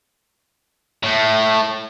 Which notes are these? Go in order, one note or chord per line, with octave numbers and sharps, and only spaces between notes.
A2 A3